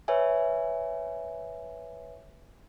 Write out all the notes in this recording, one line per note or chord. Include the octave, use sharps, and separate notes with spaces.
B4 C#5 E5 G#5